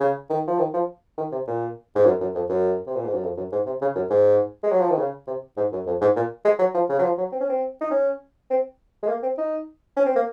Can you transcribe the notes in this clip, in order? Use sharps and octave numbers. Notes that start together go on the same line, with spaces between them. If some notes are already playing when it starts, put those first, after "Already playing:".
C#3
D#3
F3
D#3
F3
D#3
C3
A#2
G#2
F#2
F#2
F2
F#2
C3
A#2
G#2
F#2
F2
F#2
G#2
C3
C#3
F#2
G#2
G#3
F#3
F3
D#3
C#3
C3
G#2
F#2
F2
G#2
A#2
G#3
F#3
F3
C#3
F#3
F3
F#3
C4
C#4
C4
D#4
C#4
C4
G#3
A#3
C4
D#4
C#4
C4
A#3